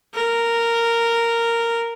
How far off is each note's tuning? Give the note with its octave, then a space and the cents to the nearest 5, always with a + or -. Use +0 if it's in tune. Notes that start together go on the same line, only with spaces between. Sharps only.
A#4 -10